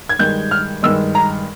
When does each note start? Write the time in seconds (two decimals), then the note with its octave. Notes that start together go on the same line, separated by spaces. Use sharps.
0.09 G#6
0.19 G2 D#3 G#3 G6
0.51 F6
0.83 G2 D#3 G#3 E6
1.15 A#5